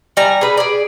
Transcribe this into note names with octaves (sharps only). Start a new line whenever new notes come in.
G3 G#5 A#5
G#4 B4
G#4 D5